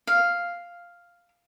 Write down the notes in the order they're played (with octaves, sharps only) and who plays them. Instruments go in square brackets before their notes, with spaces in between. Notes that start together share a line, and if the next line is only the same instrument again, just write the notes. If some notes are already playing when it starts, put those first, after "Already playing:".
[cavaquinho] F5